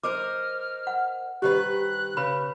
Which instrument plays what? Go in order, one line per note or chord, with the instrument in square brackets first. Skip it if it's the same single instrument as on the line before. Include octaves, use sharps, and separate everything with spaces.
[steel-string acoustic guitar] A#4 C5 D#5 [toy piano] D6 [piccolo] F6
[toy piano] F#5
[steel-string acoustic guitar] G2 D#3 B4 [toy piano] G4 C5 [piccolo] F#6
[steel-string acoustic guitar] C#3 [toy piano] B4 B5